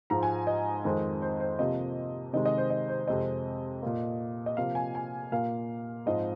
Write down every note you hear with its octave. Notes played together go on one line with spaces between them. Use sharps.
G#2 F3 G#3 A#5
G#5
D#5
F2 D#3 G#3 C4
C5
C5
C3 F3 A#3 D#5
C3 D#3 G#3 D#5
D#5
C5
D#5
C5
F2 C3 G#3 C4 D#5
A#2 A#3
D#5
C3 F3 A#3 F5
G#5
G#5
A#2 A#3 F5
G#2 F3 G#3 C4 D#5